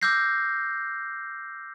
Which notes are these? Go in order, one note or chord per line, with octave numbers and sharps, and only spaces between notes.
D6 E6 F6 G6 A#6 C7